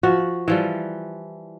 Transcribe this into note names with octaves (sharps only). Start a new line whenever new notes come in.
F3 F#4 F#5
E3 F3 G3